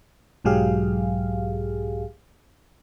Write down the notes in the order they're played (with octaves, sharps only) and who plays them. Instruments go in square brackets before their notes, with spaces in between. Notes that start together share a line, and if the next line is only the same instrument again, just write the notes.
[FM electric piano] B1 G#2 F#3 G4 G#4 F5